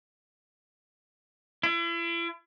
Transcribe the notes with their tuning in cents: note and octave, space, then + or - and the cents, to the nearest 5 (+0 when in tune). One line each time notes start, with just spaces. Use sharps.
E4 +40